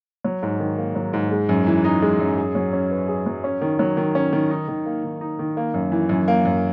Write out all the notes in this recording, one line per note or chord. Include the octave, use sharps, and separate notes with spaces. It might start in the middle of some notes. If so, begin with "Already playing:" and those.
F#3
G#2
D#3
A#3
F#3
G#2
G#3
F#2
E3
D#4
G#3
F#2
G#4
F#3
C#4
B4
G#4
F#3
C#4
D#3
F#3
D#3
C#4
D#3
D#4
D#3
A#3
D#3
D#4
D#3
A#3
F#2
E3
F#2
A#3
F#2